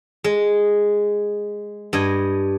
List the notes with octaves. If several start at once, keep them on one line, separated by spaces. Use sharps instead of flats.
G#3
G2 D#5 G#5